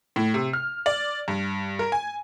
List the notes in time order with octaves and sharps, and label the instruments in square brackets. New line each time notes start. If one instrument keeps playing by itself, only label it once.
[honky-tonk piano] A2
C3
F6
D5
G2
A#4
G#5